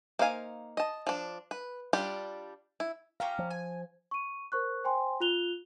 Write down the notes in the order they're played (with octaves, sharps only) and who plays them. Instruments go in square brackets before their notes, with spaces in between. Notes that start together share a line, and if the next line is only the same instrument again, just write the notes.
[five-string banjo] A#3 D#4 C5 F5 G#5
D#5 A5
F3 D4
B4
G3 D4 F4 G4
E4
[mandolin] C#4 G4 A#5 [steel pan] F5
[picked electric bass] F3
[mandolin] G#5
[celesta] C#6 D#7
A#4 C5 C#6 F#6
C5 G5 G#5 C6
F4 F#6 F7 G7